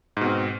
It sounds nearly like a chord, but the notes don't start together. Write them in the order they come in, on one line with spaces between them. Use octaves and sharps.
G#2 B2 C4